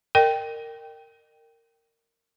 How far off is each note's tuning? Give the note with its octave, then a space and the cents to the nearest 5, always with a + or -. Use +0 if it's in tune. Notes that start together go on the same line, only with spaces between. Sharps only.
A#4 -20 D#5 -35 G5 +0